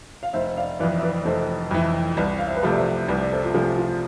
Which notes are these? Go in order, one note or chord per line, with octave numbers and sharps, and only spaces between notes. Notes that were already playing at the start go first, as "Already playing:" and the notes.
F5
F1 C5 E5
D5 F5
F2 E3 B4 D5
E5
B4 D5
F1 A4 C5
F2 E3
C2 B4 D5
F5
C5 E5
B4
C3 F3 A3 C5
D5
C5 E5
C2 B4 D5
D5
A4 C5
F4
C3 F3 A3 G#4
F4